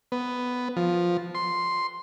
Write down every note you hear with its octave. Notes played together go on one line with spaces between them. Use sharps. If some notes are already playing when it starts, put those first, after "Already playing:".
B3
F3
C6